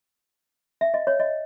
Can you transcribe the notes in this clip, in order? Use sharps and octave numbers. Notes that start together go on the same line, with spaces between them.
E5
D#5
C#5
D#5